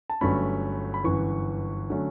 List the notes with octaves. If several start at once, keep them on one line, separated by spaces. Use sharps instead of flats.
A5
G1 G2 F#3 A3 C#4 B5
B5
G1 F#2 E3 C#6
D3 F#3 A3 C#4